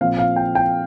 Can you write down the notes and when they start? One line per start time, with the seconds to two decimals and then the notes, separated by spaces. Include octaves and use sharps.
0.01 A#2 F3 C4 F5
0.18 F5
0.36 G5
0.55 G5